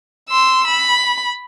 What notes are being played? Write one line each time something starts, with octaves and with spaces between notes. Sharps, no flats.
C6 E6
B5